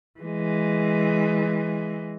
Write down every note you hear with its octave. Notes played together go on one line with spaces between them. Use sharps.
E3 G#3